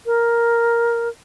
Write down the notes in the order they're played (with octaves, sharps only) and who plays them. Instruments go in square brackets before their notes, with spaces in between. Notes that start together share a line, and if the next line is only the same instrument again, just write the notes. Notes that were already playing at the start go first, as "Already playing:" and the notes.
[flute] A#4